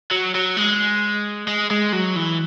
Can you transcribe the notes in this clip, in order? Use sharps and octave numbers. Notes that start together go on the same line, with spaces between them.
F#3
F#3
G#3
G#3
G#3
F#3
E3